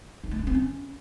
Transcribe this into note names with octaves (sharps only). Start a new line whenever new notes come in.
D#4
A3
D4
C4
C#4